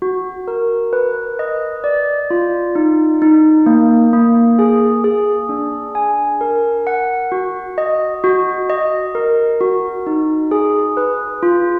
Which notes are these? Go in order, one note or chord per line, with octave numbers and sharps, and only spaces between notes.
F#4
A#4
B4
D#5
D5
F4
D#4
D#4
A#3
A#3
G#4
G#4
D4
G#5
A#4
F#5
F#4
D#5
F#4
D#5
A#4
F#4
D#4
G#4
B4
F4